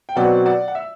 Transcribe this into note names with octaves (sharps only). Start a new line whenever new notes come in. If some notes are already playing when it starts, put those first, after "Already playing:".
G5
B2 F#3 C4 F#4 B4 D5 F#5
D5 F#5
F#5
E5